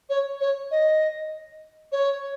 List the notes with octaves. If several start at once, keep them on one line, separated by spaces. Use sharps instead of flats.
C#5
C#5
D#5
C#5